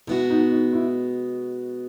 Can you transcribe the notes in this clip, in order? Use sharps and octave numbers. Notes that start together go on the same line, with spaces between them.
B2 G#3 B3 E4 F#4
D#4
D#4
E4